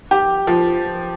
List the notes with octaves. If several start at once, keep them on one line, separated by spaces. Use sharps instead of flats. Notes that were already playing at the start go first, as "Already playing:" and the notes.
G4
F3